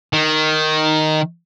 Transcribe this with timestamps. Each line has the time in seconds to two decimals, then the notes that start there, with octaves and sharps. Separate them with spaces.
0.13 D#3